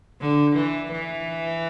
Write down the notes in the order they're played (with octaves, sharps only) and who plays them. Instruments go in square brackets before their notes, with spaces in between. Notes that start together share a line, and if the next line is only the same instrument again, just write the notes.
[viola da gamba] D3
E3
E3